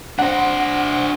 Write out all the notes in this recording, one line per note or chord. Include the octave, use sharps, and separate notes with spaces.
D4 C5 F#5